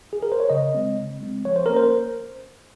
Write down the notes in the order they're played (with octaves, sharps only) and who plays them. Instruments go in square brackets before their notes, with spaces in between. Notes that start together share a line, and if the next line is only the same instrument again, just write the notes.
[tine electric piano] G#4
A#4
C5
C#5
C#3 D#5
G#3 C4
C#3
G#3 C4
F3 C#5
C5
A#3 C#4 A#4
C5